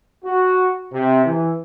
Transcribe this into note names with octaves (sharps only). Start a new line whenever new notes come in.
F#4
C3
E3